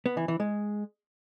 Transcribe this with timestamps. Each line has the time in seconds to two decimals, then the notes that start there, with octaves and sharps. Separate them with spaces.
0.06 B3
0.17 E3
0.28 E3
0.40 G#3